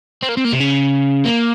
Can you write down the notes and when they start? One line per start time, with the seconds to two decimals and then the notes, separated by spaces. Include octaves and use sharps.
0.22 C4
0.29 A#3
0.37 C4
0.45 A#3
0.53 C3
0.60 C#3
1.25 A#3